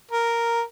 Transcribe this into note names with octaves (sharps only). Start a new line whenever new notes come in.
A#4